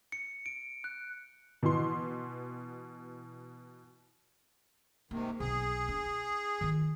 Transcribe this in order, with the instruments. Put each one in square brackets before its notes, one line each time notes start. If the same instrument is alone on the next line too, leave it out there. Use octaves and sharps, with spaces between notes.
[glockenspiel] C#7
D7
F#6
[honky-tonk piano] B2 E3 C6
[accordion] G#2 C3 D#3 [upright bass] A#3
[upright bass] B1 [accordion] G#4
[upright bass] D4
D#3 F4